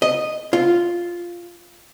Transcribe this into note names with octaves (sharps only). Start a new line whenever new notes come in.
D#5
F4